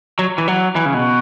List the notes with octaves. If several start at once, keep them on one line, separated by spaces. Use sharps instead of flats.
F#3
E3
F#3
E3
C#3
B2